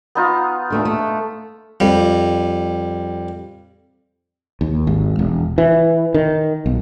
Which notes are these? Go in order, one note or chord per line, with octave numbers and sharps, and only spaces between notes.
B3 D#4 F4
D#2 A3 D4
A3
F2 G3
D#2
G#1
E1
E3
D#3
B1